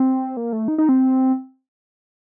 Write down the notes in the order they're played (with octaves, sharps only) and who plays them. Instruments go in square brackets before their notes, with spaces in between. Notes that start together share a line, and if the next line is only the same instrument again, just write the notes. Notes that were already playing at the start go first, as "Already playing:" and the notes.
Already playing: [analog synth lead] C4
A#3
A3
D#4
D#4
C4